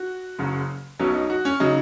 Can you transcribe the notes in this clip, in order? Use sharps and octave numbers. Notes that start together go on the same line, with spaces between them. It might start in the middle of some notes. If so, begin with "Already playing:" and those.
Already playing: F#4
F#1 F#2 C#3 F#3
B1 B2 F#3 C#4
D#4
F#4
C#4
C#3 F#3 D#4